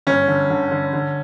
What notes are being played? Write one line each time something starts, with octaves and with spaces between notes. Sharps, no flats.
G1 C#4
D3
D3
D3
D3